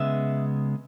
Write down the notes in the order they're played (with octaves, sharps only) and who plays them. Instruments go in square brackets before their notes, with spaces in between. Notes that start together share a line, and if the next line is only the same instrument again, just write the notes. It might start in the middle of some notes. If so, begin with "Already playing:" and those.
Already playing: [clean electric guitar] C#2 C#3 G#3 B3 E5